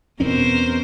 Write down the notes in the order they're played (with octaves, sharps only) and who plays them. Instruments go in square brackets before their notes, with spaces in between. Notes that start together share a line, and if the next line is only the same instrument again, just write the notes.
[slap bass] E2 C4 C#4 [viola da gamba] B2 A#4 C5